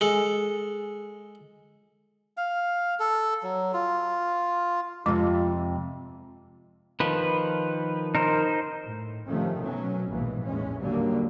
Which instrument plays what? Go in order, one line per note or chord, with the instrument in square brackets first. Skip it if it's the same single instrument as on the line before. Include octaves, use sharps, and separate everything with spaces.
[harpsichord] G#3 A4
[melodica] F5
A4
F#3
F4
[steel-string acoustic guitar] F2 C3 [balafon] G#3 [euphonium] F4
[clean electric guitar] D#3 F3 [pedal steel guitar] B4
[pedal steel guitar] D#4 A#4 C5
[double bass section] A2
C3 D#3 F3 A3 C#4
B2 F#3 C#4
A#1 D#2 G#2 B2 E3
E2 A2 G#3 C#4
D#2 D3 F#3 G3 A#3